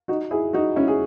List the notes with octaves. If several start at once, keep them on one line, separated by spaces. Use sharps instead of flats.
D#4 F#4
E4 G#4
D#4 F#4
C#4 E4
G#4